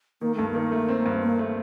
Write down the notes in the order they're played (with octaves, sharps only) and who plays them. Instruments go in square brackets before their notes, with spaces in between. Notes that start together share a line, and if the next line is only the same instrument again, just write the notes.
[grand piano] D#3 [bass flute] A#3
[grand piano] G2 [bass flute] A3
[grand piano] D#3 [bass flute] A#3
[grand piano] A3
C4
G2
[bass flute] A#3 [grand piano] C4
[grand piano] A3